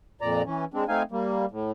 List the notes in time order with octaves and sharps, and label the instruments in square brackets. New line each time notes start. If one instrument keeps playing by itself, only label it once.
[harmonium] F2 A#2 D5 A#5
E3 C#4
G#3 C4 D4
A3 C4 D#4 F5 G#5
G3 A#3
A2